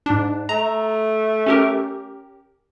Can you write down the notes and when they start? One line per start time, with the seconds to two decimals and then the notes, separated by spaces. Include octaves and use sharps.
0.06 G#2 D4
0.49 A3 A#5
1.46 C#4 G4 A#4